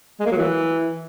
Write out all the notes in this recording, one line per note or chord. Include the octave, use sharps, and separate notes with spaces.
G#3
A#3
F#3
E3